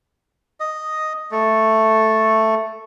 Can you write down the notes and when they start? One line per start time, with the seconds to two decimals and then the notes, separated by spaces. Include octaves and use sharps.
0.60 D#5
1.31 A3